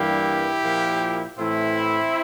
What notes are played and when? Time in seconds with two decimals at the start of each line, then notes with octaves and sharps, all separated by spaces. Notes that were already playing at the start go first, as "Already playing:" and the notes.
Already playing: G2 E3 G3 A#3 E4 G4
0.64 A#2 F3 A#3
1.38 A2 E3 A3 C4 E4